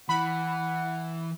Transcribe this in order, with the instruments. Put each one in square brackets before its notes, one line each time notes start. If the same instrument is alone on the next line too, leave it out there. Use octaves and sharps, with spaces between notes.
[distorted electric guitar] E3 [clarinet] F#5 [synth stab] B5